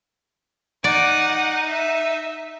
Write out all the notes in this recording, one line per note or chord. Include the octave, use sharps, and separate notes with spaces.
D#4 D5 F#5
E5